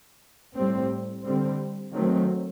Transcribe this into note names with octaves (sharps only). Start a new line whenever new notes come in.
A2 G3 C4
D3 G3 C4
D#3 F#3 A3 C4